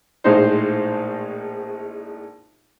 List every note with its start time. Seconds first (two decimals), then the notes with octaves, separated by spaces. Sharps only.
0.24 A#1 A2 G#3 D#4 C5